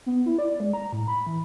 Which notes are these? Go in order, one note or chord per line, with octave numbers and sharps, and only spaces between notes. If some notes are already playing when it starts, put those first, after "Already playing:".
B3
E4
D5
G#3
A#5
A2
B5
E3